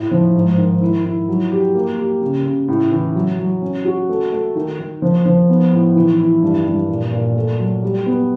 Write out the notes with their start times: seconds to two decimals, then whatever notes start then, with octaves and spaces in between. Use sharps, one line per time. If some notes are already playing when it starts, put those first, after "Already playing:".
Already playing: A2
0.11 F3
0.35 G#2
0.58 D#3
0.81 E4
1.05 E4
1.29 F#3
1.51 G4
1.75 A#3
1.98 G4
2.22 C#3
2.45 C#3
2.68 A2
2.92 E3
3.15 F#3
3.39 F#3
3.62 C#4
3.85 F#4
4.09 A3
4.32 A3
4.55 D#3
4.79 D#3
5.02 F3
5.26 F3
5.49 B3
5.72 A2
5.96 E3
6.19 E4
6.42 G2
6.66 G2
6.89 A#2
7.13 A#2
7.36 A3
7.59 F#3
7.83 G3
8.06 B3